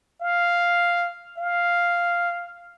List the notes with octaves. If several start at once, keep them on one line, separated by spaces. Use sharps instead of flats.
F5
F5